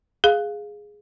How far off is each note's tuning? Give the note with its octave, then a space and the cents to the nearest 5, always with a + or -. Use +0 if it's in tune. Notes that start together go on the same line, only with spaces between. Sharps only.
G#4 +0 F5 +0